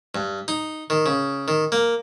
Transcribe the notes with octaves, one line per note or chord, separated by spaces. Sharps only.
G2
D#4
D#3
C#3
D#3
A#3